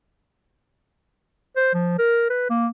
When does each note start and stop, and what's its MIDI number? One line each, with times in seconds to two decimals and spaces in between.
1.56 1.70 72
1.74 1.97 53
1.99 2.26 70
2.30 2.50 71
2.50 2.68 58